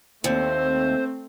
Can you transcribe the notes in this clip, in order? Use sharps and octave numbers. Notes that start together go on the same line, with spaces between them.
D#2 A3 C4 C5